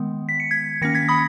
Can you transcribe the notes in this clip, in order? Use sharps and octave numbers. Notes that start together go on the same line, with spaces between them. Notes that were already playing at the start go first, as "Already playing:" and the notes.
Already playing: D#3 G#3 B3
B6
C#7
G#6 B6
D#3 A#3 C#4 A#6 C#7
G#6 B6
B5 D#6